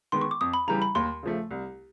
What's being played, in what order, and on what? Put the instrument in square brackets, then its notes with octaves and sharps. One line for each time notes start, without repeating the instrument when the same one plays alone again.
[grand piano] D#3 G#3 B3 [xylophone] C6
[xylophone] C#6
D6
[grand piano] F2 [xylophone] D#6
[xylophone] B5
[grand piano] C#3 E3 G3 [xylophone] A#5
[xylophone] B5
[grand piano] D#2 [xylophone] C6
[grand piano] C#3 F3 A3
C2